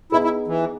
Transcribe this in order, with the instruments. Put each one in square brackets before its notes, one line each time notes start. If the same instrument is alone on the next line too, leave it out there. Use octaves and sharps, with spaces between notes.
[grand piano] B3 D#4 G#4 B4 [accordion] E4
[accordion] E4
E3